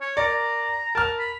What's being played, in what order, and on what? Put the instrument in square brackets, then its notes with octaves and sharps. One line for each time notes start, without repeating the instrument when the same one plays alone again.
[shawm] C#5
[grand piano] A#4 D5 [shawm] A#5
[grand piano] A#4 F6 [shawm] A5
[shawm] B5